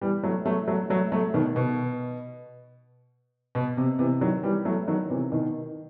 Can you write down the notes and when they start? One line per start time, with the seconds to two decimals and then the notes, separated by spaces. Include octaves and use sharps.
0.01 E3 G3
0.23 F#3 A3
0.45 F#3 A3
0.67 F#3 A3
0.90 F#3 A3
1.12 F#3 A3
1.34 B2 D#3
1.56 B2
3.55 B2
3.77 C3
3.99 C3 E3
4.21 D#3 F#3
4.43 E3 G3
4.65 F#3 A3
4.87 D#3 F#3
5.10 C3 E3
5.32 B2 D#3